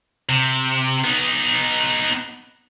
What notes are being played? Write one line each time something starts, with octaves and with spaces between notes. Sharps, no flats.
C3
B3 D#4